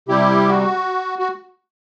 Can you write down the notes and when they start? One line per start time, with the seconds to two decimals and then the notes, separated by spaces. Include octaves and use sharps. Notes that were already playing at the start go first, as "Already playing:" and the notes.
0.08 C3 G3 E4 G4
0.48 F#4
1.19 F#4